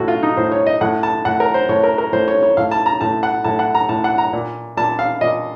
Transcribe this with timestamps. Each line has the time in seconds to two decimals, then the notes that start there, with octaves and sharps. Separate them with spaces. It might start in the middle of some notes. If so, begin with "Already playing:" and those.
Already playing: A2 F#4 A4
0.08 F4
0.23 D#4
0.37 A2 C5
0.52 C#5
0.67 D#5
0.81 A2 F#5
1.03 A5
1.25 A2 F#5
1.40 A#4
1.54 C5
1.69 A2 C#5
1.84 A#4
1.98 A#4
2.13 A2 C5
2.28 C#5
2.43 C#5
2.57 A2 F5
2.71 A5
2.86 A#5
3.01 A2 A5
3.23 F#5
3.44 A2 A5
3.59 F#5
3.75 A#5
3.89 A2 A5
4.04 F#5
4.18 A#5
4.33 A#2
4.77 A#2 A5
4.99 F5
5.21 A#2 D#5